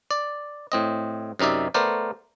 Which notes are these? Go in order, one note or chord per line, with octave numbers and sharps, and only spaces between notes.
D5
A2 C4 D#5
F#2 C3 D#4 D5 E5
A3 B3 A#4 C5 D5